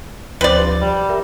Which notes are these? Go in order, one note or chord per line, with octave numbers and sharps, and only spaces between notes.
D2 F3 C4 B4 D5
G2
G3
G4 A#4 E5